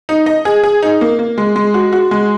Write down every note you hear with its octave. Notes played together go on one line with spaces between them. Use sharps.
D#4
D#5
G#4
G#4
D#4
A#3
A#3
G#3
G#3
F#4
F#4
G#3